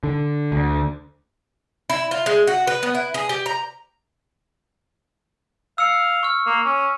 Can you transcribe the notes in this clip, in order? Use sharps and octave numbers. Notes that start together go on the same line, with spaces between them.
D3
D2
E4
F4
G#3
F#4
B4
B3
E4
G#4
G4
A#5
F5 E6 C#7
C#6 F6
A#3
C#4